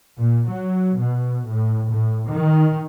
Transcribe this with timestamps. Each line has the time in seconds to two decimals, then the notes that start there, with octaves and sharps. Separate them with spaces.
0.20 A#2
0.51 F#3
1.01 B2
1.48 A2
1.90 A2
2.29 D#3